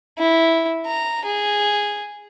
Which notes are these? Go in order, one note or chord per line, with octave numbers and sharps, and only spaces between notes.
E4
A#5
G#4